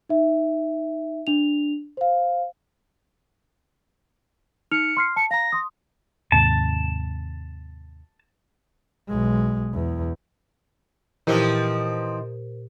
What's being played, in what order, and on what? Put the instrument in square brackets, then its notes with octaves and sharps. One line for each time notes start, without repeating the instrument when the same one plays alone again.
[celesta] D#4 E5
D4 F7
C5 F5
[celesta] D#4 F6 F7 [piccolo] C#7
[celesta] C6 F6 C7
[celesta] A5 [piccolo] C#7
[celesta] F5 A#5 [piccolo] A#6
[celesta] C6 D#6
[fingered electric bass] D#2 G#2 C3 [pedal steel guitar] A5
[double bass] B1 G#3
E2
[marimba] A#2 G4 [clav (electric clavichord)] E3 [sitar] F3 C4 D#4 [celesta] A#4 C5